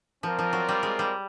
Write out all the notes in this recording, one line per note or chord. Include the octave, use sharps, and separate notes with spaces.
F3 C4 F4 A#4 D5
F3
F#3
G3
G#3
G3